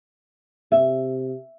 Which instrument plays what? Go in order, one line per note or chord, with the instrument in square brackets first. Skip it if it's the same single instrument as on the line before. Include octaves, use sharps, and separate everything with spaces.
[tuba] C3 [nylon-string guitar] E5